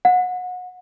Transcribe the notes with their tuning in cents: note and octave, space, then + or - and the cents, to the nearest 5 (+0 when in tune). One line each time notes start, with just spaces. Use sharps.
F#5 -30